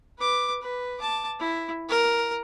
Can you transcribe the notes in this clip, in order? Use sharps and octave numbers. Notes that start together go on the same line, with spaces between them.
B4 D6
B4
A5 D6
E4
A#4